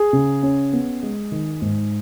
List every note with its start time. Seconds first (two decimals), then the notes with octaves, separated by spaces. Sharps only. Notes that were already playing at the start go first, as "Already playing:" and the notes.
Already playing: G#4
0.13 C#3
0.43 C#4
0.73 B3
1.03 G#3
1.32 D#3
1.62 G#2